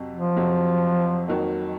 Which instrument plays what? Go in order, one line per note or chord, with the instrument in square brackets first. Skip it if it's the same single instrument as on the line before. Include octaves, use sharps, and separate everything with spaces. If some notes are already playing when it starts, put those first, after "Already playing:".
Already playing: [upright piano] F2 C3 F#3
[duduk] F3
[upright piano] F2 C3 F#3
F2 D#3 F#3 A#3